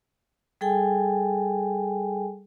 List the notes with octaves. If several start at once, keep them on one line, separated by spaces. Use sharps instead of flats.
G3 G#4 A4 G5 G#5